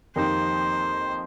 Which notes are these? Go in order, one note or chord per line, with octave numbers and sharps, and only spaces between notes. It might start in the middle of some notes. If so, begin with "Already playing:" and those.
F2 D#3 A#3 D#4 G4 C5